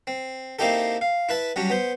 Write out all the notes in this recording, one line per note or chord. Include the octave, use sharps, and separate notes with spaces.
C4
A#3 C4 D#4 E4 G4 A4
F5
E4 B4 A5
F#3 G3 C#4 D4
B3 C5